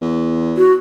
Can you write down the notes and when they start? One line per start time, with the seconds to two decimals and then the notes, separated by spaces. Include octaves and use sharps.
0.01 E2
0.57 F#4